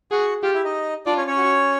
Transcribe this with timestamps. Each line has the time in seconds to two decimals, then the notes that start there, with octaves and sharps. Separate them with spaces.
0.11 F#4 G#4 F#5
0.43 F4 G4 F5
0.54 E4 E5
0.64 D#4 D#5
1.06 D4 F4 D5
1.17 C#4 C#5
1.27 C#4 C#5
1.37 F#4